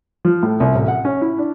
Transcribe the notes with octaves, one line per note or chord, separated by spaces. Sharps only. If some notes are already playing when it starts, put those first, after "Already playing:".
F3
A2
C2
A1
F#5
C#4
E4
D4